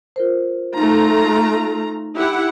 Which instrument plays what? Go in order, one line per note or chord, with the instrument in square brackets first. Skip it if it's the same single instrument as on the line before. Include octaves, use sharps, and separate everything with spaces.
[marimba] F4 A#4 C5
[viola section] A3 F4 A#5 [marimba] D#4
[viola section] E4 G4 F#5